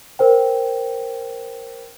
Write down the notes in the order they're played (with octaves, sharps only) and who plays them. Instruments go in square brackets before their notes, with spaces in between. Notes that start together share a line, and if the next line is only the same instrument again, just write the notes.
[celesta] A#4 C5 G5